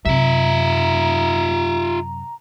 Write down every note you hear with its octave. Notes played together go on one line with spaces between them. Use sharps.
F#2 C3 F4 E5 A#5